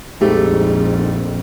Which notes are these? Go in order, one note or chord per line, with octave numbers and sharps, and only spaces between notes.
A#1 F2 G#2 G3 A3 G4